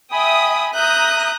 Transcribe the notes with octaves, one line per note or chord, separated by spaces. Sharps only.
E5 G5 G#5 B5 D#6
E5 A#5 D#6 F#6 G6